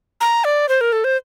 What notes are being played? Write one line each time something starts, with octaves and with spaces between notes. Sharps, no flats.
A#5
D5
C5
A#4
A4
C5